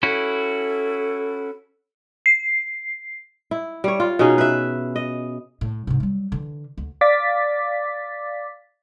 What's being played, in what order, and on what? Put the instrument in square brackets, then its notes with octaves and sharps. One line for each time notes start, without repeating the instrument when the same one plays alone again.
[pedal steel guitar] C#4 E4 F#4 [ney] A4
[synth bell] C7
[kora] E4
G3 C#5
F4
B2 C#4 D#4 G#4
B4 E5
D#5
[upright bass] A2
G#2 C3
F#3 G3
D3 E3
D2
[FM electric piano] D5 F5 D6 A6 B6